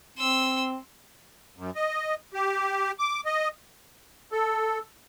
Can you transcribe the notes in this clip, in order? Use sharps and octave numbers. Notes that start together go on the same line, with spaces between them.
C4 C6 E6
F#2
D#5
G4
D6
D#5
A4